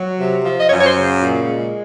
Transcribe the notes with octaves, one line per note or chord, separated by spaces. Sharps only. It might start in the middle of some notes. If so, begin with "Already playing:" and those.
Already playing: F#3
C3
F3
D#5
F#2 C#5
C#5
C5
C#3
A#2
G#3